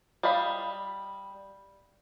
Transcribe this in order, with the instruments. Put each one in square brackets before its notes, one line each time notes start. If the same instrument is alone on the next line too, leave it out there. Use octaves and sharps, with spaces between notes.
[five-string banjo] G3 D#5 F5 B5